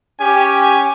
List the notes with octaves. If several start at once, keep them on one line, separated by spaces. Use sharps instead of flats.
C#4 G4 G#5